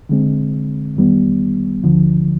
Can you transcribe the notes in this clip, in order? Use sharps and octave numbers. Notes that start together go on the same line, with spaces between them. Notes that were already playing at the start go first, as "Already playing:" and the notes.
D3 G#3 C4
F2 D#3 G3 B3
D2 D3 F3